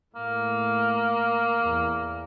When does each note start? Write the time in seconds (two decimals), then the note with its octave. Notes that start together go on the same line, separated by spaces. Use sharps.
0.15 A2 A#3
1.61 E2